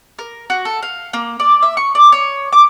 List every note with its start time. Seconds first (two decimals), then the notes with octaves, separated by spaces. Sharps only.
0.19 A#4
0.50 F#4
0.65 A4
0.83 F5
1.13 A#3
1.40 D5
1.63 E5
1.77 C#6
1.95 D5
2.12 C#5
2.53 D6